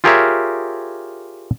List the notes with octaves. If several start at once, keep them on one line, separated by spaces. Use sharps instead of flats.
F4 G4 G#4 A#4 C#5 E5